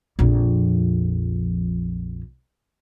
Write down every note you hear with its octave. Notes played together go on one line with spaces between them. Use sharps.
A#1 F2